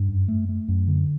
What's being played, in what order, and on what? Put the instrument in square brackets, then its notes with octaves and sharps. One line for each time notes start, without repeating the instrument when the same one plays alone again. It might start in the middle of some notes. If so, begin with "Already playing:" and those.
Already playing: [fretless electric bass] G2
F#2
A3
A3
F#2
D3